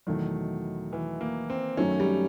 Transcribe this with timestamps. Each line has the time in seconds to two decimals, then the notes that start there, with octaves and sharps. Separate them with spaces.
0.07 E2 B2 D#3 F#3 A3
0.93 E3
1.21 A#3
1.50 C4
1.77 F#2 D#3 F#3 A3 C#4
2.00 G3